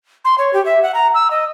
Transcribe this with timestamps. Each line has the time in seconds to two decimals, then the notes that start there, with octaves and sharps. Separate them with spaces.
0.25 C6
0.38 C#5
0.53 G4
0.65 E5
0.83 F#5
0.94 A#5
1.14 E6
1.31 D#5